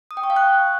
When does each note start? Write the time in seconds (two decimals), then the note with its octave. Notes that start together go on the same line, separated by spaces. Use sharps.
0.11 D#6
0.17 G5
0.23 C#6
0.30 F5
0.36 F#6